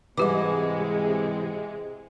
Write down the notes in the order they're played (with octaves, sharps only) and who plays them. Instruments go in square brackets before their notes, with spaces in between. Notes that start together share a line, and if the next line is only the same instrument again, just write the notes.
[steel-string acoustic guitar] G#2 E3 [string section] C3 G#3 [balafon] G3 G4 D6